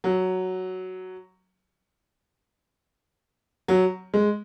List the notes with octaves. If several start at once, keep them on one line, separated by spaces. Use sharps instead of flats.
F#3
F#3
G#3